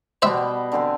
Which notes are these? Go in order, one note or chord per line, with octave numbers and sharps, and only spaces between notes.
B2 G3 B3 C5 E5
D3 C4 G#5